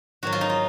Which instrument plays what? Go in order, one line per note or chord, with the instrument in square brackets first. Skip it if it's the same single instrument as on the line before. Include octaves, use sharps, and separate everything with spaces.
[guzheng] G#2 D#3 F#3 F#4
F4
D#4
F4